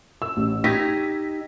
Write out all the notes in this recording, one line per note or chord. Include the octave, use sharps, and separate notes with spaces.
E6
A1
D#4 G4 G#6 A#6 B6